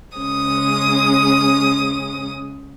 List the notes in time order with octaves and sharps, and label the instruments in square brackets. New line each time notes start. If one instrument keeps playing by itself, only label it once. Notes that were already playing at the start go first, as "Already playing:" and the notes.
[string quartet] C#3 G#3 C#4 D#6